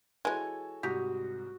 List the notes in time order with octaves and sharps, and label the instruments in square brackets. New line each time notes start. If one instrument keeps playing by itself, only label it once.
[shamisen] E3 G#3 [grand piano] F#4 A4 C#5 [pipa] G#5
[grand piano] C2 G#2 D#6 [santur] F#4 [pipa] G4